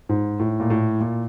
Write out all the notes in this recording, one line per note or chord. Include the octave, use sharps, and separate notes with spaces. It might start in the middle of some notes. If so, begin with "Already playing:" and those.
G#2
A2
A#2
A2
A#2